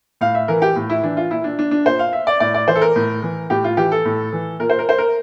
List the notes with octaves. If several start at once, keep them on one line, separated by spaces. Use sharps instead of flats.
A2 F5
E5
E3 A#4
G4
A2
E4
E3 D4
F4
A#2 E4
D4
D4
D4
A#2 C5
F5
E5
D5
A2 D5
D5
E3 C5
A4
A#4
A2
E3
A2 G4
F4
E3 G4
A4
A2
E3
A#2 A#4
C5
A#4
C5
A#4